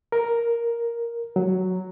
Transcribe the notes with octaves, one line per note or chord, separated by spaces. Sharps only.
A#4
F#3